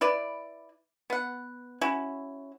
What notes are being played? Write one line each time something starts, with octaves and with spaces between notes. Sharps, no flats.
E4 B4 D5
B3 F#5
C#4 E4 F#4